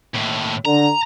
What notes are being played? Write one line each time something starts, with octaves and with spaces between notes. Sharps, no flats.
D#2 A2
D3 A#5